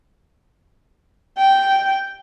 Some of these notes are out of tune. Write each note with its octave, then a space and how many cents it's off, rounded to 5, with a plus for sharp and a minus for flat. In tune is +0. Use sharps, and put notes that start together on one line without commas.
G5 -5